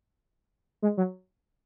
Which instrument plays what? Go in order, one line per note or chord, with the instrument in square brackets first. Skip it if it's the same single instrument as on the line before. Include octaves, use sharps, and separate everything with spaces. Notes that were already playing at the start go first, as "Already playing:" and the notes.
[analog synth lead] G#3
F#3